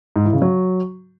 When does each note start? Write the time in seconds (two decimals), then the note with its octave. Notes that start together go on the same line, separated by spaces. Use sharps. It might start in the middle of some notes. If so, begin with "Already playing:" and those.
0.16 G#2
0.24 E3
0.33 C#3
0.42 F#3